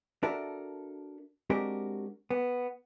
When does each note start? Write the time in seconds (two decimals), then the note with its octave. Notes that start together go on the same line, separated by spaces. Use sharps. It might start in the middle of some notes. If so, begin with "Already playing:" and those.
0.23 D4 F#4 A4 A#4 E5
1.50 G#3 C4 D4 F#4 G4 A#4
2.30 B3